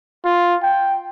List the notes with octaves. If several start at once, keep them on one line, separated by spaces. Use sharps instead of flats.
F4
G5